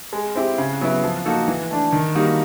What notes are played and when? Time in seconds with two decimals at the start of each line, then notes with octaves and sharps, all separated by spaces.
0.13 G#3
0.35 C4 E4 G4
0.58 C#3
0.81 F#3 B3 E4
1.04 F3
1.26 A#3 D#4 F#4 A4
1.48 E3
1.71 A3 D4
1.93 D#3
2.15 G3 A#3 D#4 F#4